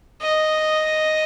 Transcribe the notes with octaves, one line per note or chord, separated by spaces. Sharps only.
D#5